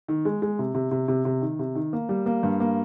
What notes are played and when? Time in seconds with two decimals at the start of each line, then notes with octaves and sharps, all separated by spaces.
0.08 D#3
0.25 G#3
0.42 G#3
0.59 C3
0.74 C3
0.91 C3
1.08 C3
1.25 C3
1.42 D#3
1.59 C3
1.75 D#3
1.93 A#3
2.09 G3
2.26 A#3
2.43 G2
2.60 A#3